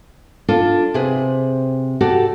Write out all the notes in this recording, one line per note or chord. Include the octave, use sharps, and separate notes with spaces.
D4 F4 A4
C3 G#4 B4 C5
F#4 G4 A4 D5